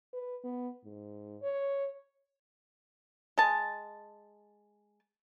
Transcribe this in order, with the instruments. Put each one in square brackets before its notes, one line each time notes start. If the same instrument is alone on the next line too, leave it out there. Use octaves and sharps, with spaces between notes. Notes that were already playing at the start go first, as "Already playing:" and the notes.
[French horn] B4
B3
G#2
C#5
[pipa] G#3 A5